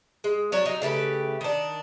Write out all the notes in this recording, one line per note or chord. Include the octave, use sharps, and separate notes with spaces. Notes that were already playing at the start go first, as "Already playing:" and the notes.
G#3
F#3 D4 C#5
F#3 D#4
C#3 A3 G4 B4
D#3 D4